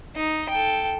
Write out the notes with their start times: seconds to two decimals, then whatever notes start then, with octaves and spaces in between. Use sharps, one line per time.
0.16 D#4
0.49 A4 G5